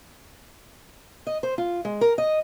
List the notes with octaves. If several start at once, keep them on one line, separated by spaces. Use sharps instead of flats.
D#5
C5
F4
G#3
A#4
D#5